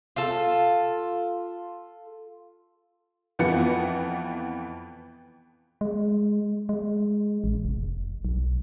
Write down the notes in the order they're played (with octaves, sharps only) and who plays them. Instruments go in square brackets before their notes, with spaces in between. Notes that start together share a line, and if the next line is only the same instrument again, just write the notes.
[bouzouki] F4 A4
[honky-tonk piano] F2 E3 B3 F4 C#7
[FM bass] G#3
G#3
A1
F1
B1